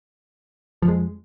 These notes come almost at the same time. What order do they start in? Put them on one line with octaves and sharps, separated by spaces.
F3 F2 G#3